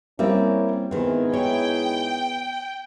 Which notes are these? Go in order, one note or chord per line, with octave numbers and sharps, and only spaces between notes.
G3 A#3 C4 C#4 E4 C#5
G#2 D#3 B3 C4 E4 G#4
C#5 G5